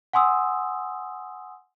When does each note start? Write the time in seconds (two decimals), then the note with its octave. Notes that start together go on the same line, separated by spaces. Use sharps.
0.13 F#5 G#5 C6 D#6 E6